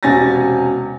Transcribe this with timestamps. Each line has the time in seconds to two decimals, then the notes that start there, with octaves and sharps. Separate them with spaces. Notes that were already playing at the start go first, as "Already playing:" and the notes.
0.03 E1 C3 C#4 G#5 A6 A#6